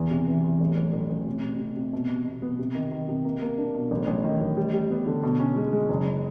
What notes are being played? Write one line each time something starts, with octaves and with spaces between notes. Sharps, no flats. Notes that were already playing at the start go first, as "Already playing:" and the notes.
Already playing: E2 E3
C3
E3
E2
A1
A1
A1
A1
C3
C3
C3
C3
B2
B2
B2
B3
C3
D#3
D#3
C3
A#3
A#3
D4
B2
A1
A1
D#3
A1
G3
G3
B3
D3
B2
C#4
G#3
G#3
F#1